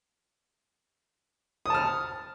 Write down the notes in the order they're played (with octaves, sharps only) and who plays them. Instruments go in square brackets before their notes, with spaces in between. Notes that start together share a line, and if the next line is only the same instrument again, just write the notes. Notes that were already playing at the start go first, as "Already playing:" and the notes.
[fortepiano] D#6
A5
F6